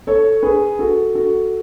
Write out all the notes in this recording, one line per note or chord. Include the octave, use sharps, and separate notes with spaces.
A4 C#5
G#4 B4
F#4 A4
F#4 A4